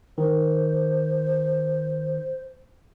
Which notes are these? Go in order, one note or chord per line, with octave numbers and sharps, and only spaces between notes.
D#3 C5